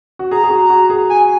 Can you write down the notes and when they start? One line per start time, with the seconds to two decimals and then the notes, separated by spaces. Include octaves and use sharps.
0.19 F#4
0.31 G#4 A#5
0.44 G#4
0.50 F#4
0.70 F#4
0.90 G#4
1.10 G#5